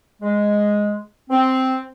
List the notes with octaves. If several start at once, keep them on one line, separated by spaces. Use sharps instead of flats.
G#3
C4